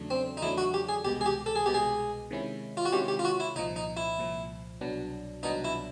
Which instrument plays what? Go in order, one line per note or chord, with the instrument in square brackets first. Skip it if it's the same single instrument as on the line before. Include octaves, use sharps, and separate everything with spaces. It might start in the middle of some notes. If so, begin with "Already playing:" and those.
Already playing: [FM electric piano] E2 C#3 F#3 A3 D4
[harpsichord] C4
D#4
[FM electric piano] E2 C#3 F#3 A3 D4 [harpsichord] E4
[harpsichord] F#4
G4
G#4
[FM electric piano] C2 B2 G#3 B3 [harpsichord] G4
[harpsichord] G#4
G4
A4
G#4
[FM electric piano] C2 B2 G#3 B3 [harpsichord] G4
[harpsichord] G#4
[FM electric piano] C3 D#3 G#3 C#4 E4
[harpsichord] F4
F#4
[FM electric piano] C3 D#3 G#3 C#4 E4 [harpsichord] G4
[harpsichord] G4
F4
F#4
E4
[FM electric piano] C2 A#2 F3 [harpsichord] D#4
[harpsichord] D#4
E4
[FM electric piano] C2 A#2 F3
C2 B2 F#3 B3 D4
[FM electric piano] C2 B2 F#3 B3 D4 [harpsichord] D#4
[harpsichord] E4